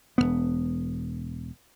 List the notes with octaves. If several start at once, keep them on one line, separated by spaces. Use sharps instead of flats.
E1 D#2 B3